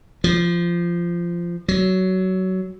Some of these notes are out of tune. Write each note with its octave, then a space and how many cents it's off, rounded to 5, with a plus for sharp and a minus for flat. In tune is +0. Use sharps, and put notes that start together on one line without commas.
F3 -15
F#3 +15